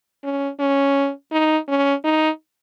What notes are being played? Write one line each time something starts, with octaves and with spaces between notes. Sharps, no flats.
C#4
C#4
D#4
C#4
D#4